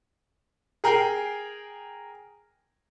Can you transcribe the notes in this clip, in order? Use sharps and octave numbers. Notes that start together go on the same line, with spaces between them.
G#4 A#4 G5 G#5 C7